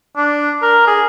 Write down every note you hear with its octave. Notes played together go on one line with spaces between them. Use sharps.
D4
A#4
G#4